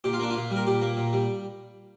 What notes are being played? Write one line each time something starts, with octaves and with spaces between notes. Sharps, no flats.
A#2 G4
F4
A#3 D4
F4
A#2
G3
A#4
A#2 G4
A#3
A#2
G3